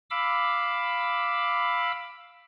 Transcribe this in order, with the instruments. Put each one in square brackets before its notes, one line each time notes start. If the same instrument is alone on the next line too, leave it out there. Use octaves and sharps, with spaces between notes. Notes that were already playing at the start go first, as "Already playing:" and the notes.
[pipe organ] F5 B5 D6 E6